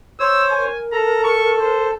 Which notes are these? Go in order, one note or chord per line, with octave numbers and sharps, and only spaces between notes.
C5 C#5 E6
A#4 G#5
A4 A#5
C#6
C5